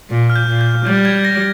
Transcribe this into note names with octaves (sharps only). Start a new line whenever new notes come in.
A#2
F6
G6
A#2
G6
G3 G6
G#6
A#6